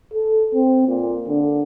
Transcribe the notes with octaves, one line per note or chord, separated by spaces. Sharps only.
A4
C4
A#2
D3